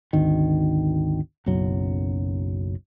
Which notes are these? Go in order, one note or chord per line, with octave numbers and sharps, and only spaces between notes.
G#1 D2 D#3
F#1 B1 F#2 F#3